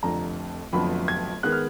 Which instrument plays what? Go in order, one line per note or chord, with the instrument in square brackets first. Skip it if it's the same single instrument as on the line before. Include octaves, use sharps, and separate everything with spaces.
[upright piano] F1 F2 D3 A#5
F1 F2 D3 F#3 B3 B5
G#6
D#3 G#3 B3 F#6
F6